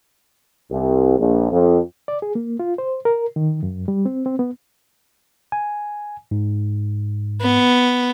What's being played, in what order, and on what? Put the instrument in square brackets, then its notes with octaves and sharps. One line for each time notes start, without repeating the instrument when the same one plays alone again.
[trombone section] C2
A#1
F2
[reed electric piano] D5
G#4
A#3
F4
C5
A#4
D#3
F#2
G3
C4
C4
B3
[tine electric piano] G#5
G#2
[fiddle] B3